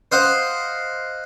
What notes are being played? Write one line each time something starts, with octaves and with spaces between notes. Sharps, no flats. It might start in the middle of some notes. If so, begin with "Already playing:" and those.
C5 D#5 F5 F#5